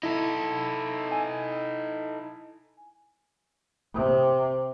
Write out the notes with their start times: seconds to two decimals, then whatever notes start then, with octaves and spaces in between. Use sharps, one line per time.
0.03 D#4 E4 A4
1.12 G#5
3.94 C3